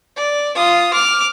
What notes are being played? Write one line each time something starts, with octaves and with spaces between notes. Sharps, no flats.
D5
F4 D#6
D6 F6